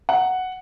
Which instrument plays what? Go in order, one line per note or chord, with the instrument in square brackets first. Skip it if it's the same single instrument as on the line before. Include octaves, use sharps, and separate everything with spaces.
[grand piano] F#5